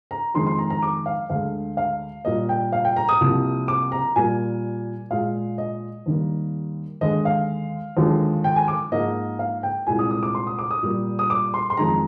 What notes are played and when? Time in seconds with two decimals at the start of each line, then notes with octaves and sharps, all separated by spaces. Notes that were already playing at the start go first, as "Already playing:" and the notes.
0.11 A#5
0.34 F2 D#3 G#3 C6
0.46 C6
0.58 A#5
0.70 A#5
0.82 D6
1.06 F5
1.30 D2 D3 G#3 F5
1.77 F5
2.25 A#2 G3 A#3 D#5
2.49 G5
2.72 F5
2.85 G5
2.96 A#5
3.09 D#6
3.20 C2 C3 F3 A#3
3.68 D6
3.92 A#5
4.16 A#2 G3 A#3 G#5
5.10 A#2 G#3 F5
5.58 D#5
6.06 D#2 D#3 G3 A#3
7.01 D#2 D3 G#3 D#5
7.25 F5
7.97 D#2 D3 F3 G#3
8.44 G5
8.56 G#5
8.68 D6
8.92 G#2 F3 A#3 D#5
9.39 F5
9.63 G5
9.87 C2 A#2 G#3 G#5
9.99 D#6
10.11 D#6
10.23 D6
10.35 C6
10.47 D#6
10.59 D6
10.71 D#6
10.82 A#2 G3 A#3
11.19 D#6
11.30 D6
11.54 C6
11.70 C6
11.77 F2 D#3 G#3 A#5